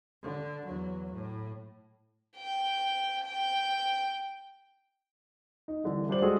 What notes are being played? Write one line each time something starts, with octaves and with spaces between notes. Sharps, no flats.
D3
E2 F#3
A2
G5
G5
D#4
C2 D3 E3
A#2 G3 D4 C5 D5 F#7
G#3 A3 D4 F#4 G#4 A4